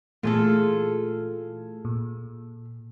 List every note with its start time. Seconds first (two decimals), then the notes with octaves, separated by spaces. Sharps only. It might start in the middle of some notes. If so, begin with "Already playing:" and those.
0.23 A#2 E3 A3 F4 G#4 A4
1.85 A#2